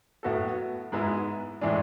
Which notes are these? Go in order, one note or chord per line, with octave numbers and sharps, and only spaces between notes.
A2 F#3 B3 F#4 A4
G#2 G#3 B3 E4
A2 E3 G#3 D4